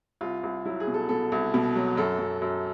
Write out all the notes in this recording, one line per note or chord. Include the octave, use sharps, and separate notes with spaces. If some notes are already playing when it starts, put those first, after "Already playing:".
C2 F4
C2
F#3 E4
G#4
B2
A4
B2 A4
C2
B2
F#3
F#2 A4
F#2
F#2